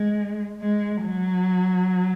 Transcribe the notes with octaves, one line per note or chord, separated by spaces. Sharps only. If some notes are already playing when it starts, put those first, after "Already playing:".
Already playing: G#3
G#3
F#3